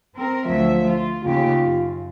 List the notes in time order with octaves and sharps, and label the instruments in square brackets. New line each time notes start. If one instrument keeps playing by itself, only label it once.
[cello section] C4 A#4
[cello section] D2 F#3 E5 [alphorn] F3
[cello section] F4
[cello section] D#2 C#3 G4 [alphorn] F4
[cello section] F#2